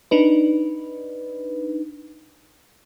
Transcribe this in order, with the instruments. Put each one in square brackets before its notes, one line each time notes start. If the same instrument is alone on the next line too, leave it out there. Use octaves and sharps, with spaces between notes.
[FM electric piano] D4 D#4 B4